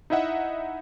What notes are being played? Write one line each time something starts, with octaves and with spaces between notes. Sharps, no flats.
D#4 E4 D#5 E5 F#5